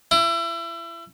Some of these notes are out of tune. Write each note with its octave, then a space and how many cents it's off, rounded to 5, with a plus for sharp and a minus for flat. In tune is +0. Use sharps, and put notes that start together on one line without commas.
E4 +30